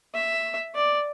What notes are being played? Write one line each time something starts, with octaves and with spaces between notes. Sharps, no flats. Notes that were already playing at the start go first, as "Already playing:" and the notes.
E5
D5